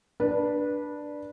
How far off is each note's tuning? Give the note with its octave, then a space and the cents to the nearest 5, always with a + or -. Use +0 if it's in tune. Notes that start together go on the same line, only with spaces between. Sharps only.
D4 +5 B4 -15